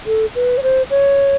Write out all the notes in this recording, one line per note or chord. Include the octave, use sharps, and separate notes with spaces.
A4
B4
C#5
C5
C#5